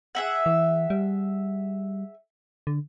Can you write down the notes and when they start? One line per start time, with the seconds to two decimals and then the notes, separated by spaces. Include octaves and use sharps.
0.15 G#4 E5 F#5
0.46 E3
0.90 G3
2.67 D3